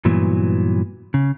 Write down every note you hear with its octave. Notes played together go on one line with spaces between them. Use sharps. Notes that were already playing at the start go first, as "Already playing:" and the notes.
G2 A#2 E3 F#3 B3
C#3